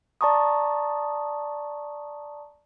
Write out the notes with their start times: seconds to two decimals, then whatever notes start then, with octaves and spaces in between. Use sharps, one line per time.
0.21 D5 A5 A#5 C#6 D#6